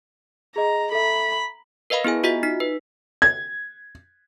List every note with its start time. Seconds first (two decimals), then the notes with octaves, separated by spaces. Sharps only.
0.56 G#4 D#5 A#5
0.92 A4 E5 B5
1.90 A#4 B4 D#5 F5 B5
2.04 B3 E4 G#4 G#5
2.24 F4 F#4 D#5 E5 B6
2.43 D#4 B6
2.60 B4
3.22 G#6